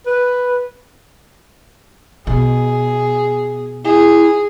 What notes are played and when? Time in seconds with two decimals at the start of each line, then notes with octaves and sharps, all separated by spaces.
0.06 B4
2.27 B2 G#4
3.84 E4 G#4